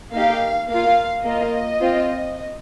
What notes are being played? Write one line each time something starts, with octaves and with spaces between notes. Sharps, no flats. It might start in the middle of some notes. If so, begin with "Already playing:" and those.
A#3 D#4 G4 F5
A#3 F4 F5
A#3 F4 D#5
C4 F4